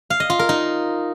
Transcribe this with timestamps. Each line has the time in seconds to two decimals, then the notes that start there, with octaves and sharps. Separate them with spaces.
0.10 F5
0.20 D#5
0.30 F4
0.39 A#4
0.49 D#4